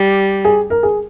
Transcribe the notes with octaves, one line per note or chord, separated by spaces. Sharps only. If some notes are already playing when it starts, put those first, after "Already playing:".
Already playing: G3
G#4
A#4
G#4